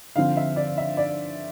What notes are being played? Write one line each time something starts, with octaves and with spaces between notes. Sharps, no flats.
D3 F3 C4 F5
E5
D5
E5
D5